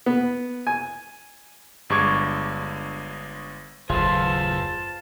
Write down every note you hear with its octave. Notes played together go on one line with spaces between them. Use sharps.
B3
G#5
G1 G2 G#3 C#6 D6 G#6
F#1 D#2 A2 F4 G#4 B4 C5 A5